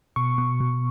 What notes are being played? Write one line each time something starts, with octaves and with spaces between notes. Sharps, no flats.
B2 C#6
B2
B2